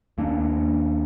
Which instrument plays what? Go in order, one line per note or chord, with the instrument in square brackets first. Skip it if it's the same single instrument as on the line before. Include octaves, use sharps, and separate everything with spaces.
[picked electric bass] D#2 A#3 C#4 D4